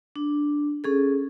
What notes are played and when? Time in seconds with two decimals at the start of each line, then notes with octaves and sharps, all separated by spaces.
0.16 D4
0.84 C#4 G#4 A4